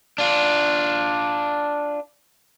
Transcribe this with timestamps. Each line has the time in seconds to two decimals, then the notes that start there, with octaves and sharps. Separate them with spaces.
0.18 D4 F4